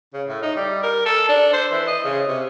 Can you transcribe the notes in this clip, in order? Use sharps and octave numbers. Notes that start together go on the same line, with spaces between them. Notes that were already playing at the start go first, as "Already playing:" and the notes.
C#3
A2
D#4
G3
A#4
A4
D4
C5
E3
D#5
C#3
C3